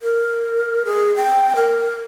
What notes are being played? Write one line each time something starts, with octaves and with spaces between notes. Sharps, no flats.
A#4
G#4
G5
A#4